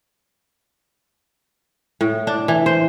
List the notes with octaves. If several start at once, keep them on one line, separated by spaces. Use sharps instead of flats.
A2
D4
E3
C5